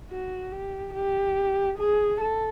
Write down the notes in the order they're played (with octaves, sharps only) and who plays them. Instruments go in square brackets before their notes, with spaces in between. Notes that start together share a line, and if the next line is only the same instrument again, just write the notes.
[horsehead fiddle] F#4
G4
G4
G#4
A4